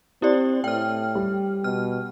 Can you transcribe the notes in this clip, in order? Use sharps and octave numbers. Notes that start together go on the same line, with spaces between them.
C4 E4 G4 D5
A2 G5 F6
G3
B2 F6